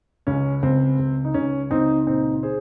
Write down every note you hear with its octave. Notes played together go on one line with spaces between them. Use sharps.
C#2 C#4
C#2 C4
C#2
D#4
C#2 C#4
C#2 C4 D#4
A#2 C4 D#4
G#4 C5